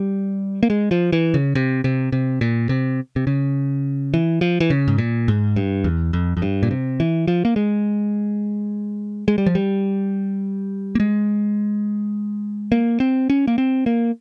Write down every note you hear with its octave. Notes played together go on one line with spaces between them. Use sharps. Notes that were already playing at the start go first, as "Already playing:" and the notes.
Already playing: G3
A#3
G#3
F3
E3
C#3
C3
C3
C3
A#2
C3
C3
C#3
E3
F3
E3
C#3
G#2
A#2
G#2
G2
E2
F2
F2
G2
A#2
C3
E3
F3
A#3
G#3
G#3
G3
F3
G3
A#3
G#3
A#3
C4
C#4
A#3
C4
A#3